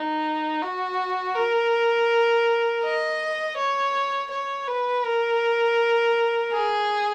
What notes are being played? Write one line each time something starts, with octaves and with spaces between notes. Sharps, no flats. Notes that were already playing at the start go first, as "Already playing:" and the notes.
Already playing: D#4
F#4
A#4
D#5
C#5
C#5
B4
A#4
G#4